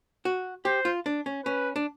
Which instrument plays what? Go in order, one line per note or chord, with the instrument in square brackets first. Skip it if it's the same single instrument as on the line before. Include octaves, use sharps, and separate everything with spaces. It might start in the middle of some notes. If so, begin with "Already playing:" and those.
[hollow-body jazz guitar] F#4
[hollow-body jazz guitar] G4 [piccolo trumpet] C5
[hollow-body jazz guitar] F4
D4
C#4
[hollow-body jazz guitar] C#4 [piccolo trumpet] B4
[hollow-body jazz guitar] D4